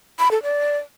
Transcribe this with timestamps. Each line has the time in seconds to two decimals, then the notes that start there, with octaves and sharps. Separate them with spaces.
0.19 B5
0.31 A4
0.43 D5